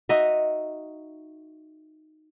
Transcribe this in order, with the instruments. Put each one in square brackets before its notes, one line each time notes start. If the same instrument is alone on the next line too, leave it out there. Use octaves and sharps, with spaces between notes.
[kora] D#4 F#4 D#5 E5